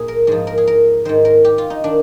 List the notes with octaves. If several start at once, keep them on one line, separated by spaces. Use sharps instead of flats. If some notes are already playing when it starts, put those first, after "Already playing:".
Already playing: A#2 G#4
A#4
G#2 F3 G#4
A#4
G#4
A#4
G#2 D#3 C5
A#4
G4
F4
D#4
D#3 D4